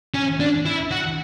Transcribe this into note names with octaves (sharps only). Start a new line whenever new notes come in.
C#4
D4
E4
F#4